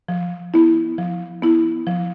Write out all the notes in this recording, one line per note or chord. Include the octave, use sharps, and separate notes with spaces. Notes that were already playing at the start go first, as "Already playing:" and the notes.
F3
B3 E4
F3
B3 E4
F3